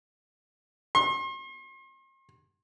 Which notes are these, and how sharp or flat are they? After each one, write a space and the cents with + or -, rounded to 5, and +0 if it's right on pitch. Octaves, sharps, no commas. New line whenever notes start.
C6 +40